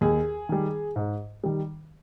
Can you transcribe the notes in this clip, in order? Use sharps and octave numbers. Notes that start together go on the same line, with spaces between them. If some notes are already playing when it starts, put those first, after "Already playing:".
D#2 G#4
D#3 G3
G#2
D#3 G3